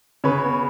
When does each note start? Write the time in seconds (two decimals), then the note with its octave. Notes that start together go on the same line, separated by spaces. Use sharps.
0.24 C#3 B4 C#5
0.44 B3